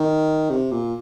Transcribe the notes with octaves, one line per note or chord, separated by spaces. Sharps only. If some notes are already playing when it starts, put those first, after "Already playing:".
Already playing: D#3
C3
A#2